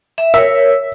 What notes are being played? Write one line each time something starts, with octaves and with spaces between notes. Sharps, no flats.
E5
A#4 C#5 E5